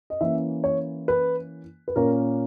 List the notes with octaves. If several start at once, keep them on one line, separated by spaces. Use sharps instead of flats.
D#5
E3 A#3 C#4 E5
C#5
B4
B4
A#2 A#3 C#4 A#4